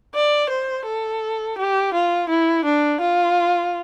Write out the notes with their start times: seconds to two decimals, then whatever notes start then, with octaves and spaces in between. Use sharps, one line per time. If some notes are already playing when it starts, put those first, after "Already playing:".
0.15 D5
0.50 C5
0.86 A4
1.59 G4
1.94 F4
2.29 E4
2.65 D4
3.01 F4